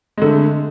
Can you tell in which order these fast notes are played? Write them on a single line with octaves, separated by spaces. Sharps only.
G#3 D3 A3